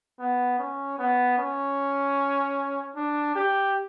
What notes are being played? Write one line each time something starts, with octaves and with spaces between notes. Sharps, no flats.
B3
C#4
B3
C#4
D4
G4